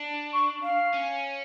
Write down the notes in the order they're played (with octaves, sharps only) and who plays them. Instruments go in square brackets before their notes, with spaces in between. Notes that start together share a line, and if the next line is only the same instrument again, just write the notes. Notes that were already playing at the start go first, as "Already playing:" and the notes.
Already playing: [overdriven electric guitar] D4
[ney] C#6
F5
[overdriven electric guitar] C#4